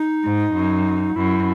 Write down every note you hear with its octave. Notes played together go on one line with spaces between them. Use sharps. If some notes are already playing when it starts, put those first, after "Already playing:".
Already playing: D#4
G#2
F#2
F#2 E4